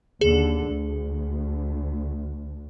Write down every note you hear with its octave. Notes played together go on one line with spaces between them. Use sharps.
D#2 D3 G#4
D2